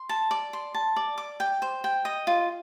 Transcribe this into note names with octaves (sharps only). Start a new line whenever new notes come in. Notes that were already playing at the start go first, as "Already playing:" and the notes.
Already playing: C6
A5
D5
C6
A5
D5
D6
G5
C5
G5
D#5
F4